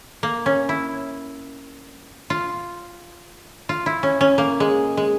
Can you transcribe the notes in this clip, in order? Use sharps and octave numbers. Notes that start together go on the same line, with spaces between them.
A#3
C#4
E4
F4
F4
E4
C#4
C#4
A#3
G#3
G#3